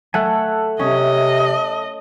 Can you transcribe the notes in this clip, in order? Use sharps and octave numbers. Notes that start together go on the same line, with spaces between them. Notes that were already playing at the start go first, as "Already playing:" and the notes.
A3 A4 F#5 G#5
C3 C#4 D#5